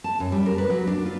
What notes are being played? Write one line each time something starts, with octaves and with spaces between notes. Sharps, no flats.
A5
F#2
G3
A#4
B4
F#3
D4
F4